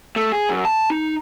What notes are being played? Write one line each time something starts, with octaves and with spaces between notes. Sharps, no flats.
A3
G#4
F#2
A5
D#4